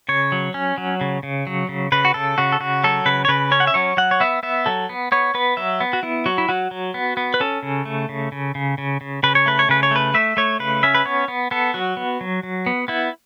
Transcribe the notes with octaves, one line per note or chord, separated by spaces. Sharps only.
C#3 C#5
F#3
C#4
F#3
C#3
C#3
F#3
C#3
C#3 B4
F#4
C#3 A4
C#3 F#4
A4
C#3 F#4
F#3 A4
C#3 B4
C#5
C#3 B4
C#4 C#5
F#5
E5
F#3 C#5
F#3 F#5
C#5
B3 E5
B3 E5
F#3 A4
B3
B3 C#5
B3 B4
F#3 E5
B3
F#4
B3 E4
F#3 F#4
E4
F#3 F#4
F#3
B3
B3
B4
C#4 A4
C#3
A3
C#3
C#3
C#3
C#3
C#3
C#3 B4
C#5
A3 B4
C#5
C#3 B4
C#5
A3 B4
A3 E5
A3 C#5
C#3 B4
C#4 E5
B4
B3 C#5
B3
B3 A4
F#3 F#4
B3
F#3
F#3
B3
B3 E4